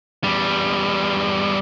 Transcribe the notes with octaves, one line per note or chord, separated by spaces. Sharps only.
E2 G3